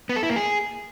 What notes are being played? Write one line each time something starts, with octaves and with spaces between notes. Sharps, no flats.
B3
A4
E4
A#3
G#4